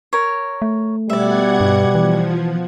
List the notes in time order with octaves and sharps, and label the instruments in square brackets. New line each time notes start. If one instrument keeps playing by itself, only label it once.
[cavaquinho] A#4 C#5
[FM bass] A3
[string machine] B2 F#5 G#6 [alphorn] G3 [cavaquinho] D5 E5
[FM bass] G2
[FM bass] E3 [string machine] F3